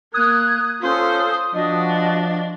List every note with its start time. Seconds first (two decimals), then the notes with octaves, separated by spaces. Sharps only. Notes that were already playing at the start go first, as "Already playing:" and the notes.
0.14 A#3 D#6 F#6 G#6
0.82 C#4 F4 A4 C5
1.55 F3 D4 F#4 D#5